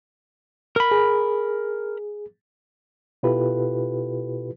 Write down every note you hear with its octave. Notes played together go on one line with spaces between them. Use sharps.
A#4 B5
G#4
B2 E4 F4 G4 A4 B4